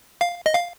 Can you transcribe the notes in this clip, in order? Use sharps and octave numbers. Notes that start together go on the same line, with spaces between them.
F5
D#5
F5